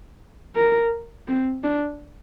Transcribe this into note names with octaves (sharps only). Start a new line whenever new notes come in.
A#4
C4
D4